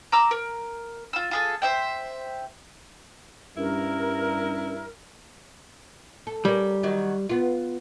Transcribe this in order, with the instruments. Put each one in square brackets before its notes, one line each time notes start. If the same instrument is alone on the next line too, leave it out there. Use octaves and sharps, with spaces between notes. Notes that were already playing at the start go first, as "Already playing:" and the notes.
[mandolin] A#5 D6 E6
A#4
F4 E6
F4 G#4 A4
C5 E5 G5
[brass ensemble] G2 [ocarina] C#4 [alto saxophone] E4 [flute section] A#4
[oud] A4
[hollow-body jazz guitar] G3 [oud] C#4 A#4
[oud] D#3 F#3 F#4
B3 F4